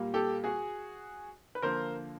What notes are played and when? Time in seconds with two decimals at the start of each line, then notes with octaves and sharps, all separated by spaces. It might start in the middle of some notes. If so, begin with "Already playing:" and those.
Already playing: A#2 G3 A#3
0.14 G4 A4
0.44 F#4 G#4
1.55 B4
1.62 D3 F3 A#3 A#4 C5